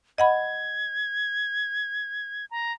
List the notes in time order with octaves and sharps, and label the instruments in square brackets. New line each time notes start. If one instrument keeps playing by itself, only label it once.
[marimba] D#5 F#5 B5 [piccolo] G#6
[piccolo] A#5